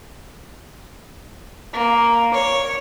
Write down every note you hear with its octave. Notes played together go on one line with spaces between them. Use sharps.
A#3
C#5